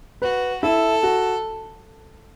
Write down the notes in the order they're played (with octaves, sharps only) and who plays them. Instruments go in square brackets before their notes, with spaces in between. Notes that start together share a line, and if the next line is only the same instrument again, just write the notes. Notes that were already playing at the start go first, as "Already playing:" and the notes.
[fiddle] F#4 [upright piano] B4
[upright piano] E4 [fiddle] A4
[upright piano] F#4